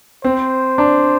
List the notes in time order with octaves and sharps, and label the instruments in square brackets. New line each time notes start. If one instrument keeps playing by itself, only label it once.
[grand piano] C4 [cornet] C5
[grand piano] D4